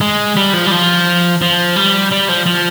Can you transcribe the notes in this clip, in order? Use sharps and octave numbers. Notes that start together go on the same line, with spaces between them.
G#3
G3
F3
G3
F3
F3
G3
G3
F3
F3